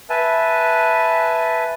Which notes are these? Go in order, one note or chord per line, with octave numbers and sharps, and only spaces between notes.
B4 E5 G#5 A5